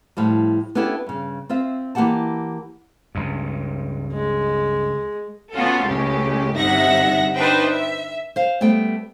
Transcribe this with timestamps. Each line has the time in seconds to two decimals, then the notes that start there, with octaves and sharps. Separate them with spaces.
0.17 A2 F3 G3
0.75 B3 C#4 D4 E4 G4 A4
1.07 G2 C#3
1.49 C4 F4 E5
1.95 E3 A#3 D#4 G4 F#5 A5
3.15 C#2 G2
4.13 G#3
5.52 B3 C#4 F4 F#4 A4
5.86 C#2 A2 C#4 G4
6.57 G1 C3 D#4 E5 F#5 A#6
7.36 D4 D#4 B4 C5 E5 G5
7.69 E5
8.36 C5 F5
8.61 G3 A3 B3 C5 G5